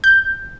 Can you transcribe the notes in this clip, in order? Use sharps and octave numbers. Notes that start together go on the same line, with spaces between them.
G6